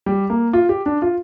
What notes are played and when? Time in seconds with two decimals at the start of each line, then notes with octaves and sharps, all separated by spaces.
0.06 G3
0.30 A#3
0.53 F4
0.69 G4
0.86 D4
1.02 F4